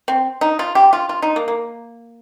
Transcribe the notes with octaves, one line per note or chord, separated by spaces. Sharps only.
C4
D#4
F4
G4
F4
F4
D#4
A#3
A#3